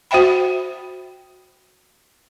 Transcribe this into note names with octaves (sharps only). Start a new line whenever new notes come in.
F#4 C5 E5 G5 B5